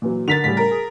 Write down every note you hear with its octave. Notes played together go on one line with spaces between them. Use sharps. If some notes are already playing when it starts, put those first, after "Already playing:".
A#2 E3 F#3
D3 A#4 A6 B6 F7
A2 C#3 G3 B6
A#4
G#4